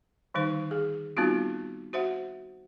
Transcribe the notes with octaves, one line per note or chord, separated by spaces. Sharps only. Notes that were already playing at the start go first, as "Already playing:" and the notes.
D3 D#3 G3 D#4 C5
G#4
G3 B3 C4 D#4 F4 F#4
F#4 C5 E5 F#5